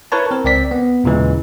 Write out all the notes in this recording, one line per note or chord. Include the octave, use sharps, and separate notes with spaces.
E4 A#4 B4 C#5 A5
C4 A#4
C#2 C4 D5 B6
B3
D#2 A#2 C#3 E3 G#3